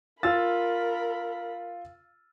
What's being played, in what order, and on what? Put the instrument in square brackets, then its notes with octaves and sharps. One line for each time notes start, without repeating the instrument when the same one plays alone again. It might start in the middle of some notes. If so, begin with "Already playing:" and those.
[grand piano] F4 E6 A6 [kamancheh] A#4 B5